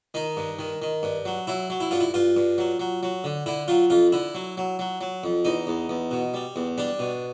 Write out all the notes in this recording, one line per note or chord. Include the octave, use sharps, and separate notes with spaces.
D#3 D#4
G2
D#3
D#3
G2
F#3
F#3 E4
F#3
E4
G2 F4
E4
G2 F4
G2
F#3
F#3
F#3
D3
D3 E4
F#3 F4
F2 F4
D3 E4
F#3
F#3
F#3
F#3
F2
E2 D#4
E2
E2
B2
G3
E2
G3 D4
B2